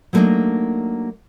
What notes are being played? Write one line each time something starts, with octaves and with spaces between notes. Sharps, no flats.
F#3 G3 A3 A#3 D4 D#4